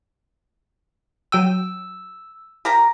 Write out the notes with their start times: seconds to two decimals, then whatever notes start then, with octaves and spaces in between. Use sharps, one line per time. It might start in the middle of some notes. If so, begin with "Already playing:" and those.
1.32 F#3 G5 E6 D#7
2.65 G4 A#4 A#5